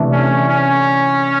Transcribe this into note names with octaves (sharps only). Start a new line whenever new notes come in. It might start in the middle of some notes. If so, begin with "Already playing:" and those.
Already playing: C3 E3 A3 D4
C#4
C#4